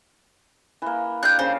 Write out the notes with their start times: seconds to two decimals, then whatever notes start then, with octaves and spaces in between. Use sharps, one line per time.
0.82 E3 A#3
1.23 D4 G4 F5 F#6 G6
1.39 C#3 C5